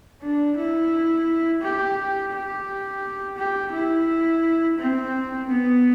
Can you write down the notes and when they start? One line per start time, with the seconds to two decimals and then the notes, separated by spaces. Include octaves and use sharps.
0.21 D4
0.57 E4
1.62 G4
2.32 G4
3.37 G4
3.72 E4
4.78 C4
5.48 B3